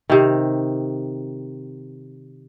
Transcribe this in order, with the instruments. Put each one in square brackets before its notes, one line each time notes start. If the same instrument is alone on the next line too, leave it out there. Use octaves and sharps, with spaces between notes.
[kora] C3 D#3